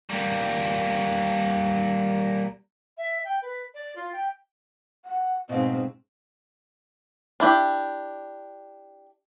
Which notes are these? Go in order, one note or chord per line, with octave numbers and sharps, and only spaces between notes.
G3 A#3
E5
G5
B4
D5
F4
G5
F#5
G#2 B2 C4 D#5 F5
D4 E4 G4